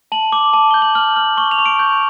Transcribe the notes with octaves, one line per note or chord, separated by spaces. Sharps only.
A5 F#7
D6
A5
G6 G7
F#7
F6 F#7
F6 F#7
C#6 G7
F7
C#6
D7
G6